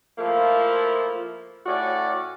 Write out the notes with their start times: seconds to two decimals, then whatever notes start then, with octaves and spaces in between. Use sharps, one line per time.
0.18 F3 A3 A#3 E4
1.66 A2 C#4 F#4 D5